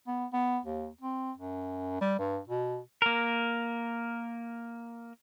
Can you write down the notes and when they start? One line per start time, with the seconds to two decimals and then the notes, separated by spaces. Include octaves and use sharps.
0.07 B3
0.33 B3
0.65 D#2
1.01 C4
1.37 F#2
2.01 G3
2.19 G2
2.48 B2
3.02 A#3 A#4